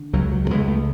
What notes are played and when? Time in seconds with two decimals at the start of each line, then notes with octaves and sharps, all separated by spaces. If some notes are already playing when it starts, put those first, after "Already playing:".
Already playing: D3
0.13 C#2 F#3
0.32 F#3
0.44 F#3
0.50 C#2 G#3
0.68 A3